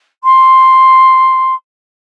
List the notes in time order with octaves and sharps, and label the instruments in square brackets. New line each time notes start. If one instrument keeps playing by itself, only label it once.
[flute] C6